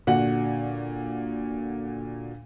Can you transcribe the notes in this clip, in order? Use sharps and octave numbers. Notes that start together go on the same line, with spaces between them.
A#2 D3 F#4 F#5